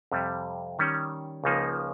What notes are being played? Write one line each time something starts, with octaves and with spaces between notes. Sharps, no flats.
F2 C3 G3
D#3 G3 C#4
C#2 C#3 F3 A#3 D#4